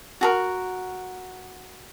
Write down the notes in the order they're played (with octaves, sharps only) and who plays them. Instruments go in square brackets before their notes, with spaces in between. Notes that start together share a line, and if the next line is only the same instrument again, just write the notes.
[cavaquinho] F#4 G#4 A#4